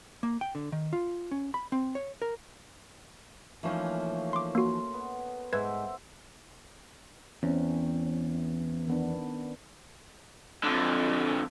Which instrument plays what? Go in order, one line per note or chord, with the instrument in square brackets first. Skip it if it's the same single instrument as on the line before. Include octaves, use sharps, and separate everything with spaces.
[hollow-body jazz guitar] A#3
G5
D3
D#3
F4
C#4
B5
C4
C#5
A#4
[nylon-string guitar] E3 F3 D#4 [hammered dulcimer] A3 A#3 C#4
[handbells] C6 D6
[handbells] A#3 F#4 [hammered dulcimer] C6
[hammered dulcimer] B3
[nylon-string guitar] G#2 [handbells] B4 G#6 [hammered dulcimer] C5 E5 F#5
[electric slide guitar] E2 [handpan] C4 C#4
[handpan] D#3 B3 D4
[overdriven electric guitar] F2 D3